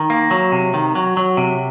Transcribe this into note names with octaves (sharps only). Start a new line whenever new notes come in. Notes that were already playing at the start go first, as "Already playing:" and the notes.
Already playing: D#3
A#3
F#3
C3
D#3
F#3
F#3
C3